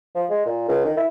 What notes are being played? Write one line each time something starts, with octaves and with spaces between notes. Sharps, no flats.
F3
G#3
A#2
C#2
D#3
E4